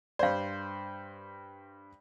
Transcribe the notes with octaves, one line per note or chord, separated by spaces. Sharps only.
G2 C5 D5 F5